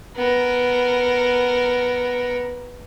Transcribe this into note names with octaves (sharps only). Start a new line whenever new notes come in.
B3 A#4